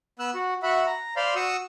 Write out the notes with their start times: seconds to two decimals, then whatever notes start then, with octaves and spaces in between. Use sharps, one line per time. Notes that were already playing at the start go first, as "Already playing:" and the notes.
0.19 B3 E6 F#6
0.35 F#4
0.63 F#4 E5 F#5 B5
0.87 A#5
1.16 C5 D5 F5 B5 C6
1.36 F#4 C#6 D#6 E6